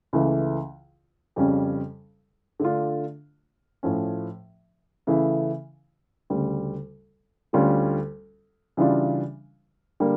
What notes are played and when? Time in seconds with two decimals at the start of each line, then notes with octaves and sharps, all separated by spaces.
0.13 C#2 C#3 E3 A3 E4
1.36 F2 C#3 G3 C#4
2.60 D3 A3 D4 F4
3.83 A2 F3 C#4
5.07 C#3 E3 A3 E4
6.30 D2 C#3 G3
7.53 D2 D3 G3 C#4 F4
8.77 C#3 E3 G3 D4 F4
10.00 D3 G3 A#3